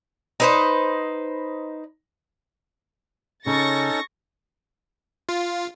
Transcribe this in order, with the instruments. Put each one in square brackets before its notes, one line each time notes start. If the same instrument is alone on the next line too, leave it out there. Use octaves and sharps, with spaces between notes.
[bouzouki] D#4 B4 C5
[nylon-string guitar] C#3 [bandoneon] C#4 D#4 A4 [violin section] C#6 A6 A#6
[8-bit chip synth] F4